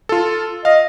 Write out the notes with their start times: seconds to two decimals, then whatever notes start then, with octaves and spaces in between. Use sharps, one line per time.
0.09 F4 A4
0.65 D#5 F5